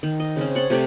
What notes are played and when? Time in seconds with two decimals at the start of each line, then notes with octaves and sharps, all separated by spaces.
0.03 D#3
0.20 D#5
0.36 C#3 C4 C#4
0.55 C#5 F#5 A5 C6
0.70 C3 A3 D5 D6